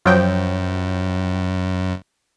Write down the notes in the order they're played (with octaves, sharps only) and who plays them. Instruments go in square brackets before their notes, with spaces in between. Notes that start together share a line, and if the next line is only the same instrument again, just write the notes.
[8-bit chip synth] F#2 [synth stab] F3 F#3 G5